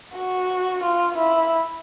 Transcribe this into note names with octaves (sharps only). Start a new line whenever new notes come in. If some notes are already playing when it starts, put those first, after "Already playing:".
F#4
F4
E4